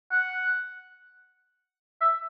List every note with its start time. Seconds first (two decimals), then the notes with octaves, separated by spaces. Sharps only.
0.11 F#5
2.01 E5